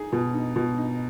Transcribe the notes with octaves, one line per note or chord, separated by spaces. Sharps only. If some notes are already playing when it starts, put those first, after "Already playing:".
Already playing: D#4 G#4
B2
D#4
B2
D#4